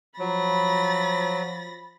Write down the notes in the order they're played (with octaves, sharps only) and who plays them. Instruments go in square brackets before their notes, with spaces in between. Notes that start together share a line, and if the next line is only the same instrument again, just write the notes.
[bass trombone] F3 [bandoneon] F#3 [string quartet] B5 A6 A#6